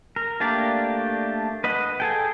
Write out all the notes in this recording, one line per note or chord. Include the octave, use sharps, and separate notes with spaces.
A#4
A3 A#3 D4 G4 D5
B4 D#5 F#5
G#4 A4 G5